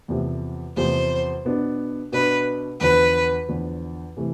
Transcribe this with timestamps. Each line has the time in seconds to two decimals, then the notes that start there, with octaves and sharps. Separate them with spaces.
0.08 E2 C3 F3 A3
0.77 E2 C3 F3 A3 C5
1.45 B2 B3 D4
2.12 B2 B3 D4 B4
2.80 E2 D3 F3 B4
3.49 E2 D3 F3
4.17 C3 E3 A3